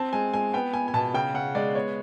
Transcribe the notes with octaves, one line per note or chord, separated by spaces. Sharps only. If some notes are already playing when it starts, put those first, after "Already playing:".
Already playing: C4 A5
G#3 G#5
G#3 G#5
B3 G5
B3 G#5
G#5
B2 A5
C#3 G5
C#3 F#5
G#3 D5
B3 C#5